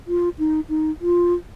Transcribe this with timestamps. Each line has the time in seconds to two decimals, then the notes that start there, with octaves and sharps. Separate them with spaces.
0.07 F4
0.39 D#4
0.69 D#4
1.01 F4